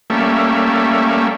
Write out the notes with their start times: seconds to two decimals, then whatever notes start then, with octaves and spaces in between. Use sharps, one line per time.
0.10 G3 A3 A#3 C#4 E5